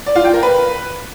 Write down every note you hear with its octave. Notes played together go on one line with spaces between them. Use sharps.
D5
F4
G5
A#4
B4